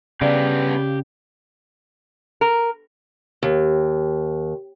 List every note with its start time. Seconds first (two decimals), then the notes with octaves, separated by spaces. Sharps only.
0.21 G2 C#3 B3 G4 D5 F5
2.41 A#4
3.43 D#2